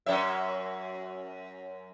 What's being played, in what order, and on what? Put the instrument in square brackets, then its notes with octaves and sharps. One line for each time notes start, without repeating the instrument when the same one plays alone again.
[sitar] F#2 C#4 E5